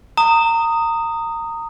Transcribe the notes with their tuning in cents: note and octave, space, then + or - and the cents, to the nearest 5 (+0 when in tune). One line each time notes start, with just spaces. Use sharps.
A#5 -25 D#6 +0